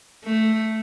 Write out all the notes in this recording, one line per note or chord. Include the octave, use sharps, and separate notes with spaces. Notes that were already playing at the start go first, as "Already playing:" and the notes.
A3